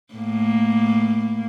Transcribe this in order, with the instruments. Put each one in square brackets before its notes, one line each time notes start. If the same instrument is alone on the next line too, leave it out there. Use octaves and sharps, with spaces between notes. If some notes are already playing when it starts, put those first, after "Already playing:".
[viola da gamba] A2 A#3